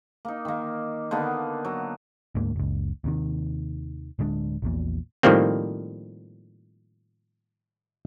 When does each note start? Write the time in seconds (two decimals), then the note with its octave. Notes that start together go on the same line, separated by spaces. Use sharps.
0.25 A#3 D#4
0.45 D#3 A#3
1.11 D3 D#3 A#3 B3
1.65 F#3
2.35 D2 G#2 A#3
2.56 F#1 C#2
3.04 D#2 C3 D#3
4.19 D1 D3 G#3 D4
4.62 A#1 E2 A#2
5.23 A2 D#3 F3 G3 A#3 C4